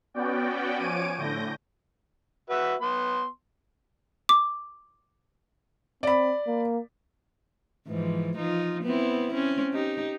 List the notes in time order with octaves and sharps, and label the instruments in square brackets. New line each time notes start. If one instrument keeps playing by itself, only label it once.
[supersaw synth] B3 C#4 F#4 D5 G5
F3 C#5 G#5 D6 D7 D#7
A2 D3 G6 A#6
[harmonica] F#4 B4 E5
B3 C6
[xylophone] D6
[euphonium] C4 [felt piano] D5 B5
[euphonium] A#3
[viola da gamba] G#2 E3 F3
F3 D#4 F4
B3 C4 E4
C4 C#4
D#4 G4